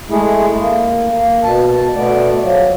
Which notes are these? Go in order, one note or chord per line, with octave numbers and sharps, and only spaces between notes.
G#3 A3 E4 G#4
A#3
A#3
B2 A5
B2 A3 B3 D5
F3 F#3